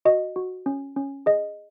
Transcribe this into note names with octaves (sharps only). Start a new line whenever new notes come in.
F#4 D#5
F#4
C#4
C#4
G#4 D#5